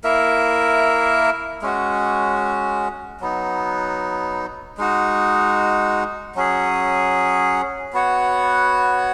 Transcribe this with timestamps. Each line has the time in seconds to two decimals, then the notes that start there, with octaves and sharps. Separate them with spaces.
0.04 A#3 E4 A#4 E5
1.62 G#3 C#4 F#4
3.20 F#3 B3 D#4
4.78 G#3 D#4 F#4
6.35 F#3 C#4 G#4
7.93 B3 F#4 C#5 F#5